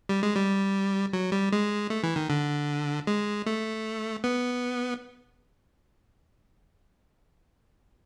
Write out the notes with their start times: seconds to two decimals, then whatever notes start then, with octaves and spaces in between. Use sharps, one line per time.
0.09 G3
0.23 G#3
0.36 G3
1.13 F#3
1.32 G3
1.52 G#3
1.90 A3
2.03 E3
2.16 D#3
2.30 D3
3.07 G#3
3.46 A3
4.24 B3